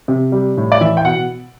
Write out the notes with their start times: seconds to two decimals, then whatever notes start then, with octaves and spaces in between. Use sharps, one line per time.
0.08 C3
0.32 G3
0.57 A2
0.72 D5
0.81 E3 E5
0.97 G5
1.05 B2 F#5